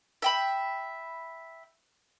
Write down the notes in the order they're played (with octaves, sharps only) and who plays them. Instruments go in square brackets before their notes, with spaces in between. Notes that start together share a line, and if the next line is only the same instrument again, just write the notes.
[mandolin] E5 G5 B5